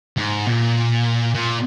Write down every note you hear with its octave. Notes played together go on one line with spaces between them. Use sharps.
G#2
A#2
A#2